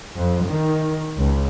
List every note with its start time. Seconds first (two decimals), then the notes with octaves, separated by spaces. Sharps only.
0.17 F2
0.47 D#3
1.19 C#2